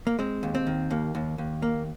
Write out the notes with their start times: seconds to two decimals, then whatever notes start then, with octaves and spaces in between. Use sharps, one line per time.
0.07 A#3
0.19 G#3 C4
0.43 D#2
0.55 C4
0.67 D#3
0.90 D#2 A#3
1.15 D#2
1.38 D#2
1.62 A#3